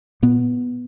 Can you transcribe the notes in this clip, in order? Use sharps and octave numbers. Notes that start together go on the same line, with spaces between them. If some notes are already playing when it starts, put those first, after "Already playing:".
A#2 B3